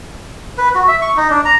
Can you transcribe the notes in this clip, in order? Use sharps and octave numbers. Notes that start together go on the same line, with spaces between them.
B4
F#4
E5
C#6
D#4
D4
A#5